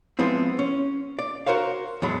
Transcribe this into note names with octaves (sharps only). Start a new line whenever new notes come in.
F3 G#3 B3 C4 E4
C#4
D5
F#4 A#4 C5 C#5 F5
E2 A2 F#3 G#3 B5